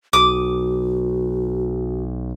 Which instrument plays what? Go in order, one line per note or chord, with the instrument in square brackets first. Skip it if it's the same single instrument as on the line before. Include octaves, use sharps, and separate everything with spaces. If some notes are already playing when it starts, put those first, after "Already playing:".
[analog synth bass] B1 [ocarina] F#4 [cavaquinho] D6 D#6